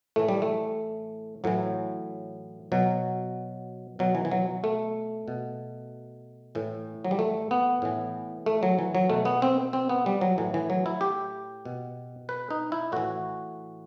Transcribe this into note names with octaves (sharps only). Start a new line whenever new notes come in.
A2 E3 A3
G3
A3
A2 E3 F#3
B2 F#3
B2 F#3
E3
E3
F#3
A3
B2
A2 E3
F#3
G3
A3
B3
A2 E3
A3
F#3
E3
F#3
B2 A3
B3
C4
C4
B3
G3
F#3
A2 E3
E3
F#3
E4
G4
B2
B4
D#4
E4
A2 E3 F#4